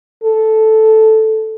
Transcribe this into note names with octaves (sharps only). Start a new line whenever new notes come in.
A4